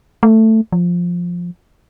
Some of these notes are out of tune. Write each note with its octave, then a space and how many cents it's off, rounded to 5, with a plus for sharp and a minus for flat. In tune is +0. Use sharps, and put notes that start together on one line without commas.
A3 +10
F3 +5